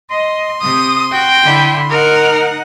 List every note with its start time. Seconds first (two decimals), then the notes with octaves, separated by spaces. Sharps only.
0.11 D#5 C6
0.61 C3 D#6
1.12 F#4 G5
1.44 D3 E4
1.90 D#4 A#4 F#5